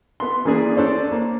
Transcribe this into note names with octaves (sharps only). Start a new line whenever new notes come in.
B3 C6
E3 A#3 B3 D4 G#4
D4 A4 C5 C#5
A#3